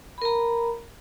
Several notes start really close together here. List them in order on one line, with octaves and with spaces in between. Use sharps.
B5 A#4 A#5